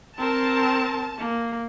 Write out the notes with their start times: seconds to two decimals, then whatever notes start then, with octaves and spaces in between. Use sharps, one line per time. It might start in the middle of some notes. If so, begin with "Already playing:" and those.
0.18 C4 A#4 A5
1.18 A#3